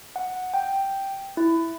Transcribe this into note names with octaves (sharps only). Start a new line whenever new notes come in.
F#5
G5
E4